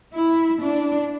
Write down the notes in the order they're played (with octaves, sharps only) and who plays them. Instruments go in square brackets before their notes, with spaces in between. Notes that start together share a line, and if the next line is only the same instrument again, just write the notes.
[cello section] E4
D4